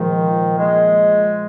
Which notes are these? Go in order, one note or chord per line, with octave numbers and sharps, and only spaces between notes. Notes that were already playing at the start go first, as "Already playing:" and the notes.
Already playing: A#2 D#3 F3 G#3 F4 C5
G#3